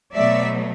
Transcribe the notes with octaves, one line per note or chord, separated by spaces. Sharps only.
B2 F#3 A3 D5 E5